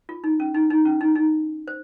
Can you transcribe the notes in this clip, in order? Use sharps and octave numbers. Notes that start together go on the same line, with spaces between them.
F4
D#4
C#4
D#4
D#4
C#4
D#4
D#4
C5